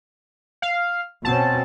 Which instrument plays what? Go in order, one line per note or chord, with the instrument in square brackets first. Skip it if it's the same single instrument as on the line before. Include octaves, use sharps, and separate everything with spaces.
[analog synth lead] F5
[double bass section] B2 C4 C#4 [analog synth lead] A5